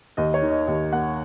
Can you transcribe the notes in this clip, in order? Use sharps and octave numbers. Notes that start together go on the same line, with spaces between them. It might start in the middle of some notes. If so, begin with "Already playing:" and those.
D#2 D#5
C#5
D#3
D#5
D#2 D#5
A#3 F#5